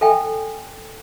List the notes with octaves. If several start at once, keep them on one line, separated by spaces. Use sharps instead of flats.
A4 E5 G5 G#5